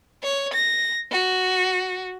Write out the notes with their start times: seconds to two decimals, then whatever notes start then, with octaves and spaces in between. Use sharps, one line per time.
0.23 C#5
0.54 A#6
1.11 F#4